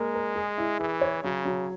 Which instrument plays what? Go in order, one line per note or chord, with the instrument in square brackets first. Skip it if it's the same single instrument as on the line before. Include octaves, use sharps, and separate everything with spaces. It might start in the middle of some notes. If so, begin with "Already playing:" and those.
Already playing: [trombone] G#3 [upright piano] A#3 A#4
[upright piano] A#4
G#4
E4
[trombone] E3 [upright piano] G#4
[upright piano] C#5
[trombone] C#3 [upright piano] F#3
[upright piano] F#3